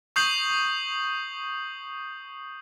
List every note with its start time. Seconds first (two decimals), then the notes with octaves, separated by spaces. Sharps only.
0.16 C#6 D#6 G6 C7 F#7